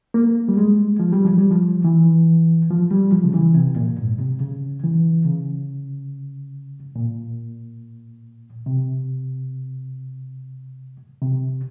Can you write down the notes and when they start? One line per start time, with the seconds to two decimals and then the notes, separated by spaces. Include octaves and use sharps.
0.14 A#3
0.49 G3
0.57 G#3
1.00 F3
1.13 G3
1.25 F3
1.38 G3
1.50 F3
1.84 E3
2.70 F3
2.91 G3
3.12 F3
3.24 C#3
3.34 E3
3.55 C3
3.76 A#2
3.98 G#2
4.19 C3
4.40 C#3
4.83 E3
5.25 C#3
6.96 A#2
8.66 C3
11.22 C3